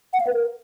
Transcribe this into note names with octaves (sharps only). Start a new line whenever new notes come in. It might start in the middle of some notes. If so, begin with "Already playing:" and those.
F#5
F5
B4
A#4